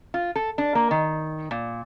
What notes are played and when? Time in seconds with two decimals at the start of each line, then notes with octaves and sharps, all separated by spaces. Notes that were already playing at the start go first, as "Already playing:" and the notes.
0.14 F4
0.36 A4
0.58 D4
0.75 A#3
0.91 D#3
1.51 A#2